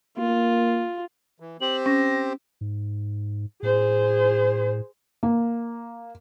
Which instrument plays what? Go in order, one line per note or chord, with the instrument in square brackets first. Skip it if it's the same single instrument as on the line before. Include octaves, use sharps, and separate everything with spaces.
[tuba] A#3 [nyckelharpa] F4
[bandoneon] E3
[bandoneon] C4 G4 C5 [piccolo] F#7
[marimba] C#4 [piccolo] A#6
[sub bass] G#2
[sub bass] A2 [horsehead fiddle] G#4 C5
[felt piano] A#3